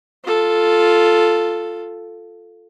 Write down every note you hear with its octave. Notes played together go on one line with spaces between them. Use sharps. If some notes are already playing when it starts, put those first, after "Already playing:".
F4 A4